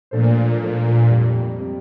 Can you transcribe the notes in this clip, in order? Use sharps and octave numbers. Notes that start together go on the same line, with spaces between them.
A#2 F3 A3 D4 A4 C5
A#2 F3 A3 D4 A4 C5
F2 C3 G3
C3 G3